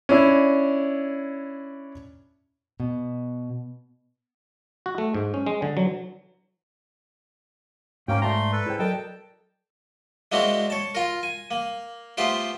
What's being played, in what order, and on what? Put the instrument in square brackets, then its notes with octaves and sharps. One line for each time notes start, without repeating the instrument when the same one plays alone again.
[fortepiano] C#4 D4 E4
[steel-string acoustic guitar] B2
[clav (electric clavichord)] F#4
A3
G#2
C#4
G#3
D3
F#3
[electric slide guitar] G#2 [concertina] A#3 C#4 G5 [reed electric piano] F#4 F5 A#5
[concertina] A3 C6 [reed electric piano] D5 A5 A#5
[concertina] A4 B4
[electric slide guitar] E4 C5 [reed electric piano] G#4 G5
[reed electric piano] F#3 A4 A#4 [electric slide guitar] D5 D#5 [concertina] G5 A5
[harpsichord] G#3 A#3 C4 D4 E4 F#4
C#5 A5
F4 A#4
G#5
A#3
A3 B3 F4 G4 C5